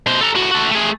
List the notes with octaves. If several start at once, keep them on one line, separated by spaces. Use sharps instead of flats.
B2 C5
A4 A#5
A2 F#4
F#4 A4
A3 G#4